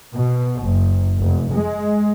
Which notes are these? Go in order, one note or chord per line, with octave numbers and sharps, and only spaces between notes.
B2
F#1
F1
G#3